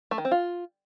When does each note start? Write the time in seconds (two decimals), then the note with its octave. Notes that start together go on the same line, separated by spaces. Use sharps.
0.11 A3
0.18 D#3
0.25 C4
0.31 F4